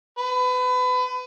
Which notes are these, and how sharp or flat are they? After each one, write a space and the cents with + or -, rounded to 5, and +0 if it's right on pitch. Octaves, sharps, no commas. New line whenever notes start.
B4 +30